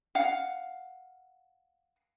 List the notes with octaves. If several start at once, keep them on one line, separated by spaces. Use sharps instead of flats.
F5 F#5